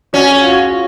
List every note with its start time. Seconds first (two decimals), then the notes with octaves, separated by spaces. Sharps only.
0.13 C#4 F#4
0.31 G#4
0.41 F4
0.46 F#4
0.63 F4